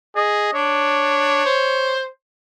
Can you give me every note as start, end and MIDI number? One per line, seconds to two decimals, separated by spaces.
0.16 0.52 68
0.16 0.52 75
0.54 1.43 62
0.54 1.96 73
1.45 2.07 72